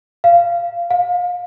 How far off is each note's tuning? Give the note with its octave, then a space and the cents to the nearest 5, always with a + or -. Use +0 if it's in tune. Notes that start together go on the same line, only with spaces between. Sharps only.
F5 -15
F5 +30